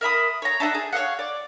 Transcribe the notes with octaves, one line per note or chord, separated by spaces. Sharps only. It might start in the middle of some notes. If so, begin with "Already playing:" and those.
A#4 E5 B5 D#6
C#5 A#5
D4 D#4 E5 F#5
G#4
C#5 D#5 F5 F#5
D5